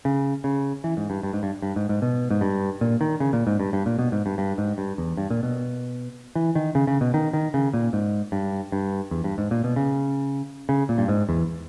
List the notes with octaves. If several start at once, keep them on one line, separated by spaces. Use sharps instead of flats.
C#3
C#3
E3
G#2
G2
G2
G#2
G2
G2
G#2
G#2
B2
G#2
G2
A#2
D#3
C#3
A#2
G#2
G2
G2
A#2
B2
G#2
G2
G2
G#2
G2
E2
G2
A#2
B2
E3
D#3
C#3
C#3
B2
D#3
D#3
C#3
A#2
G#2
G2
G2
E2
G2
G#2
A#2
B2
C#3
C#3
A#2
G2
G#2
E2